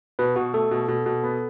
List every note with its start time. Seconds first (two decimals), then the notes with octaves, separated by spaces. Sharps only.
0.19 B2 B4
0.36 B2 F#4
0.54 A3 A4
0.71 B2
0.88 B2
1.06 B2
1.24 B3